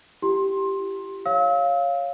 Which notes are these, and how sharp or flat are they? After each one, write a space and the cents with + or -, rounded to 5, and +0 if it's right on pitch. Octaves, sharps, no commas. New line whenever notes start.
E4 +40 G4 -5 C6 +15
C#5 +0 F5 +0 E6 -40